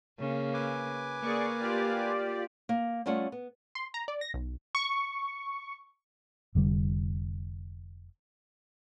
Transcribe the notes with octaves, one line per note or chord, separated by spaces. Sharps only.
C#3 A#3
B4 G#5 D6
A#3 G#4 D5 C#6
F4 G4 D5
A#3
G3 A3 C#4 F4 D5 F#5
B3
C6
A#5
D5
A#6
B1
C#6
F1 D3 G3